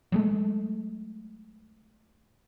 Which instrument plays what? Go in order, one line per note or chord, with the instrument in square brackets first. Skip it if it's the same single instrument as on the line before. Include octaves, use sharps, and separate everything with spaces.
[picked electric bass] F#3 G#3 A3